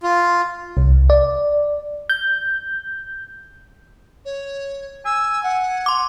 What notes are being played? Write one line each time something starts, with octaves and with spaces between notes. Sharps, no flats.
F4
C2
D5
G6
C#5
G#5 E6
F#5
C6 D6